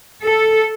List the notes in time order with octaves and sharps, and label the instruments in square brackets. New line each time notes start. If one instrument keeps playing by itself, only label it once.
[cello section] A4